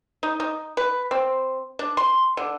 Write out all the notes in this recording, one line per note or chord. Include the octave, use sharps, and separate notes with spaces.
D#4
D#4
B4
C4
D4
C6
D3